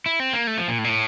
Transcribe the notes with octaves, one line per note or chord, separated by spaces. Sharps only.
E4
C4
A#3
A3
F3
A#2
A2
A#2
A2